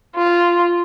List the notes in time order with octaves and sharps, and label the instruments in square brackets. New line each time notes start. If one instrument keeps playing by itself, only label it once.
[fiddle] F4